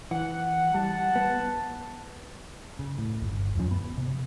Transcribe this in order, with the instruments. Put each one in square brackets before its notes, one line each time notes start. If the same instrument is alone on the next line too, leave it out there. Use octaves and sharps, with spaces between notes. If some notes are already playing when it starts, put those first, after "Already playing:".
[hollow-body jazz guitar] E3 [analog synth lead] F#5
[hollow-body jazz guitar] G3 [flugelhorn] A5
[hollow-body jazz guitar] B3
[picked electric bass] C#3
A2
D1 G1
D#1 F#2 F3 C#4
B3
C3